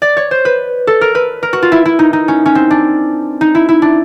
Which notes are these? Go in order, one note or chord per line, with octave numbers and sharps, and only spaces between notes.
D5
C#5
C5
B4
A4
A#4
B4
A#4
F#4
F4
E4
E4
D#4
D#4
C#4
C#4
C4
D4
D#4
E4
E4
D4